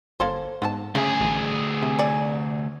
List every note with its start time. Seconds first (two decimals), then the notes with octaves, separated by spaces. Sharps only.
0.20 G1 A#3 A4 C5
0.62 G#2 B3 C4 A5
0.95 D2 C#3 A3 G#4
1.20 A1
1.82 C3
1.99 C#5 D5 G#5